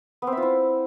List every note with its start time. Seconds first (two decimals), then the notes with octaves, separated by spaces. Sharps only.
0.22 B3
0.27 C4
0.32 E5
0.37 F4
0.42 E4